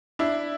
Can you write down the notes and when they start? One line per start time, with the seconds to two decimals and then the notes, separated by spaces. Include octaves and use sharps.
0.19 D4 E4